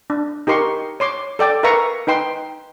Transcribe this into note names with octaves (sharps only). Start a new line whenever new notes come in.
D4
D#4 G4 A#4 C6 C#6
C#5 C6 D6
A4 D5 G5 D6
A#4 B4 E5 F5 A#5 C#6
D#4 B4 G5 C6